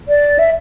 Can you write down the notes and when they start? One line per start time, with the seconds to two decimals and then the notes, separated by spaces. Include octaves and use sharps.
0.08 D5
0.39 E5